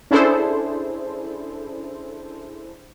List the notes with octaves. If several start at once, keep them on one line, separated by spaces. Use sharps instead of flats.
C#4 D4 E4 G#4 A4 C5